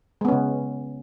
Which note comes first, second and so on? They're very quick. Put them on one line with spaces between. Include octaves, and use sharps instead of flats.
G#3 B3 C#4 C#3